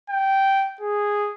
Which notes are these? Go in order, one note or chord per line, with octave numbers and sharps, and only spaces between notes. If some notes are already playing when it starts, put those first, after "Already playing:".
G5
G#4